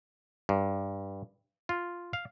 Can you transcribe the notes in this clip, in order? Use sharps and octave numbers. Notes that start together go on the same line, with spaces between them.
G2
F4
F5